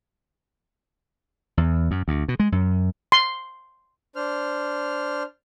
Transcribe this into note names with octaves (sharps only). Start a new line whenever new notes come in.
E2
F#2
D2
B2
G#3
F#2
C6
D4 C5 F6